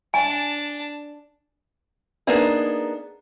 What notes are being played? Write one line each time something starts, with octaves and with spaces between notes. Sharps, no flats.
D4 G#5 A5
A#3 B3 D4 D#4 G#4